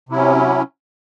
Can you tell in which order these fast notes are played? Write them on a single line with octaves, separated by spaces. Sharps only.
C3 E4 F#3 C#4